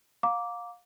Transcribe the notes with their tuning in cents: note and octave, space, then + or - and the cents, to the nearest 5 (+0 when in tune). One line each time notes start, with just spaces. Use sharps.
F5 +25 A#5 +0 D6 -10